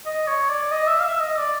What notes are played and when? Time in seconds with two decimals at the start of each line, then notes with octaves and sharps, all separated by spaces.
0.06 D#5
0.28 C#5
0.50 D5
0.71 D#5
0.88 E5
1.00 F5
1.05 E5
1.20 D#5
1.37 D5